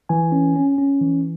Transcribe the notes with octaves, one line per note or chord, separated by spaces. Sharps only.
E3 G#5
C#4
C#4
C#4
E3